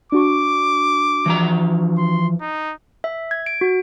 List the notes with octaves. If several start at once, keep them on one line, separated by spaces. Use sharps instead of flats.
D4 F#4 C#6 D6
E3 F3 A#5
C6
D#4
E5
G#6
D7
F#4